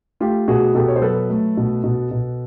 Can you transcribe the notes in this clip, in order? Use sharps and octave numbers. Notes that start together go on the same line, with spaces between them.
A3 F4 G4
B2 F#4 G#4
B2 G4 A4
C#5
C5
F#3 A4 B4
A3
B2
B2
B2